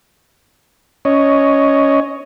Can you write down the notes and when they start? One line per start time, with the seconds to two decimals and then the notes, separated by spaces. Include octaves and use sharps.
1.05 C#4 C#5 D#5